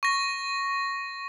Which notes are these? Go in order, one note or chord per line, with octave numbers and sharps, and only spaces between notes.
C#6 A#6